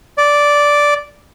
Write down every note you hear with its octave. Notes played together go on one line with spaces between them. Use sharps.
D5